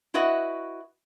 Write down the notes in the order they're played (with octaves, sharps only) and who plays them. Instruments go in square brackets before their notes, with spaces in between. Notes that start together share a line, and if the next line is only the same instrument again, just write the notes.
[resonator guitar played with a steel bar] E4 F#4 B4 D#5 E5 F#5